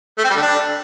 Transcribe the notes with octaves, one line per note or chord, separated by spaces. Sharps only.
A3
C4
G3
D3
D4